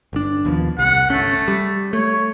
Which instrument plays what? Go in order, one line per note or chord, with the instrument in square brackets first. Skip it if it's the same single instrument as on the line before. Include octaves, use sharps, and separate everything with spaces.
[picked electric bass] G1 D4
D#2 B2 F3
[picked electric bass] C2 [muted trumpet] F#5
[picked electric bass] G1 C#4 [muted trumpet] A3
[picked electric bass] G3
[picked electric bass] A3 [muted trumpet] C#5